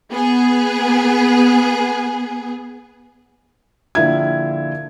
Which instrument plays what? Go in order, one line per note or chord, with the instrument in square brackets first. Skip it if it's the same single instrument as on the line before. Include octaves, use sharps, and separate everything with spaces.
[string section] B3 G#4
[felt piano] A#1 D3 A#3 E4 F4 G#6